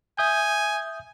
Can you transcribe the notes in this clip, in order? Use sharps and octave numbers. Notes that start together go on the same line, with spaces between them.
E5 G#5 D#6 G6